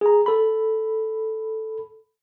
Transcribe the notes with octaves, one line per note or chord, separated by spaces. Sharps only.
G#4 A#5
A4 B5